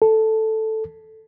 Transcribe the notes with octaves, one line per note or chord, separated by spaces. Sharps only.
A4